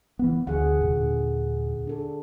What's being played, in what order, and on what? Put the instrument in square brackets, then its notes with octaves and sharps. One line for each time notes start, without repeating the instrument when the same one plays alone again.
[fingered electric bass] E3 B3
[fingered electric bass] D2 [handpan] G#4 F#5
[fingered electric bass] D#2 A#2 [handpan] D3
[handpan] D4 A4